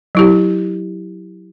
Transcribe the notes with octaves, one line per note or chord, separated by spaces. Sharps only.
F#3 E4 G4